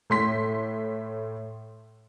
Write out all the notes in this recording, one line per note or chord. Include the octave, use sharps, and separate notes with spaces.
A2 C6 B6